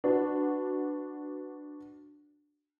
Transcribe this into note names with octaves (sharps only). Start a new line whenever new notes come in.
D4 F#4 B4